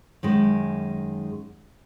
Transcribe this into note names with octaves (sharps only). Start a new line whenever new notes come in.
F#2 D#3 G#3